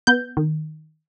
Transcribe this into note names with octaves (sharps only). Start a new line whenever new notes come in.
B3 G6
D#3